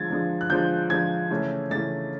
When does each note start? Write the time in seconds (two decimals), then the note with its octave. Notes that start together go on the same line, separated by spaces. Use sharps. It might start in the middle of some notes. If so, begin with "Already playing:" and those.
Already playing: D3 F3 G#3 G#6 A6
0.10 D3 F3 G#3
0.41 F#6
0.50 D3 F3 G#3 G6
0.90 D3 F3 G#3 G#6
1.30 C#3 E3 A3
1.70 C#3 E3 A3 A6